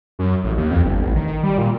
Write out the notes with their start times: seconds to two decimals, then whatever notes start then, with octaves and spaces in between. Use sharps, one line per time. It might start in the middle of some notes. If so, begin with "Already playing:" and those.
0.19 F#2
0.44 A1
0.57 D#2
0.71 F2
0.85 G1
1.02 A1
1.16 D#3
1.43 G3
1.58 A#2